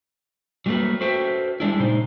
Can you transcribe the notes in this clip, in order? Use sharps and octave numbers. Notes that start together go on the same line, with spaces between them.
F#3 G3 A3 A#3 B4
F#4 A4 B4 C5 E5 G5
G3 G#3 D4 E4
A#2 C#3 G#3 D#4 C5